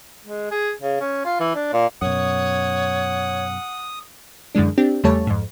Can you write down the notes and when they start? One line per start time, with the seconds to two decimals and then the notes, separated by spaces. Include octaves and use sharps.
0.25 G#3
0.51 G#4
0.82 C#3
1.00 C#4
1.25 F4
1.40 E3
1.55 D4
1.73 A#2
2.02 F#2 B2 C#5 F#5 D#6
4.55 F#2 D3 E3 G#3 D4
4.78 C4 D4 G4
5.04 E2 C#3 G3 A3 C#5 A5
5.27 F2 G#2